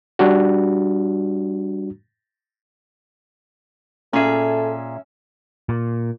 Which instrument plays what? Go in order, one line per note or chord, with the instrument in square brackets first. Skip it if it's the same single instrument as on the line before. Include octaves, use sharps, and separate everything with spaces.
[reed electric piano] G3 D4 F#4
[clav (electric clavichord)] A#2 G#4 [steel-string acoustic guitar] C#4 E5 [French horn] A4
[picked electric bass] A#2